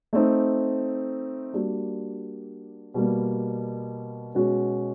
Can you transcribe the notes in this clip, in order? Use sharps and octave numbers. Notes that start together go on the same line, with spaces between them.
A3 C4 D#4
G3 A#3 D4 F#4
B2 G3 A#3
B2 G#3 C#4 F#4